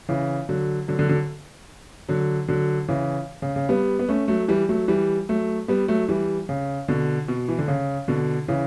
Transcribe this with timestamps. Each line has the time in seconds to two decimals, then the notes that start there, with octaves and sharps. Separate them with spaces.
0.09 C#3 E3
0.49 D3 F#3
0.88 D3 F#3
0.98 D3 F#3
1.09 D3 F#3
2.09 D3 F#3
2.48 D3 F#3
2.88 C#3 E3
3.42 C#3
3.56 C#3
3.69 G3 B3
3.99 B3
4.09 A3 C#4
4.28 F#3 A3
4.48 E3 G3
4.69 F#3 A3
4.88 E3 G3
5.29 F#3 A3
5.68 G3 B3
5.88 F#3 A3
6.08 E3 G3
6.49 C#3
6.88 B2 D3
7.28 B2
7.48 E3
7.59 D3
7.68 C#3
8.08 B2 D3
8.48 C#3 E3